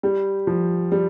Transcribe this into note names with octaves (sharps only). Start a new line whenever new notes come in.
G3
F3
G3